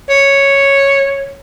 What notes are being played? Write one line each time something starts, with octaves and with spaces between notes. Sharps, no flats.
C#5